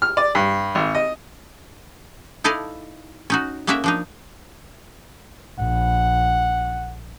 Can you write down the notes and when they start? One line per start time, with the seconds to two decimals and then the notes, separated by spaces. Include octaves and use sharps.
0.02 F6
0.17 D5
0.35 G2
0.75 G#1
0.95 D#5
2.44 D#4 E4 A4 D5 D#5 F5
3.30 C#4 D#4 F#4
3.67 G#3 A#3 C#4 F#4 A#4 E5
3.84 F3 D4 D#4
5.59 A#1 F#5